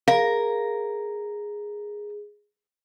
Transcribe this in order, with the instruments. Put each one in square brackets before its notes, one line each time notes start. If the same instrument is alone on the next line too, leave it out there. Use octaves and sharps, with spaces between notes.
[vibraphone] G#4 [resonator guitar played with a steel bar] A#4 [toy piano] F5